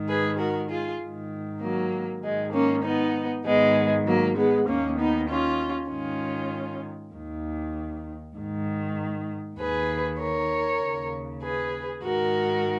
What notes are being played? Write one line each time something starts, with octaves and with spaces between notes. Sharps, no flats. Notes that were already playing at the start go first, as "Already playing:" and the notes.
Already playing: G#2 D#3
G#4 B4
F#4 A#4
F4 G#4
G#2 D#3
F#3 A#3
G#2 D#3 G#3
A#3 C#4
B3 D#4
G#2 D#3 G#3 B3
F#3 A#3
G#3 B3
D#2 D#3 A#3 C#4
B3 D#4
C#4 F4
G#2 D#3 C#4 F4
D#2 D#3
G#2 D#3
D#2 D#3 G#4 B4
A#4 C#5
D#2 C#3
G#4 B4
G#2 D#3 F#4 A#4